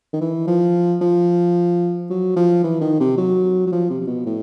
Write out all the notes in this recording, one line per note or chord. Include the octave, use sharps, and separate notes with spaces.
D#3
E3
F3
F3
F#3
F3
E3
D#3
C3
F#3
F#3
F3
C3
C3
B2
A2